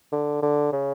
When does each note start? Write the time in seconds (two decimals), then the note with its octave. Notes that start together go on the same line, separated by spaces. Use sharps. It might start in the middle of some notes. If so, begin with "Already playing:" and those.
0.12 D3
0.42 D3
0.72 C#3